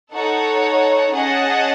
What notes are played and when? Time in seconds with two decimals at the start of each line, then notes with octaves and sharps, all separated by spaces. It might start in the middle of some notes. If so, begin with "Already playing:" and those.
0.14 D#4 A4 C#5 F#5
1.13 C#4 G#4 D#5 F#5 A5